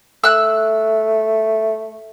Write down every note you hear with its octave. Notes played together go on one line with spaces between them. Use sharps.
A3 E6 F#6